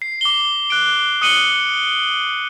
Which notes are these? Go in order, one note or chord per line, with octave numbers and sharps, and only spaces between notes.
C7
D6 G7
F#6 D7
D#6 F#6 C#7 D#7 F#7 G7